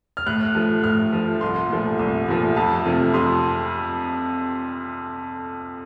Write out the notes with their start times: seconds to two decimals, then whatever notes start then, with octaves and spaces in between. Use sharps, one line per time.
0.17 F6
0.26 A2 F#6
0.55 F3 A3
0.83 A2 F6
1.13 F3 A3
1.41 C2 C6
1.70 A#2 F3 A3
1.99 C2
2.28 A#2 F3 A3
2.56 F2 A5
2.85 C3 F3 A3
3.14 F2 C6